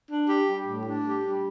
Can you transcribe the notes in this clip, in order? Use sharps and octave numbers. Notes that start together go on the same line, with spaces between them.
D4
G4
G3
A2
D4
G4
G3